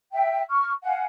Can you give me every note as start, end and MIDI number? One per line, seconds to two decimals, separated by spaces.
0.12 0.40 76
0.12 0.40 79
0.50 0.72 85
0.50 0.72 89
0.84 1.04 77
0.84 1.04 78
0.84 1.04 80